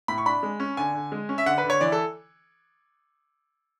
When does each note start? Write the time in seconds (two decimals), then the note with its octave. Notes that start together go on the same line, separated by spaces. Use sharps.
0.08 A2 B5
0.18 C#6
0.26 D4 B5
0.43 G#3
0.60 C#4
0.77 D3 G#5
0.95 D3
1.12 G#3
1.29 C#4
1.38 E5
1.46 D3 F#5
1.58 B4
1.64 D3
1.70 C#5
1.81 E3 D5
1.92 A4